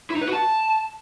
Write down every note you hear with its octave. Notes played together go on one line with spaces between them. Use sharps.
E4
D#4
B4
F#4
A5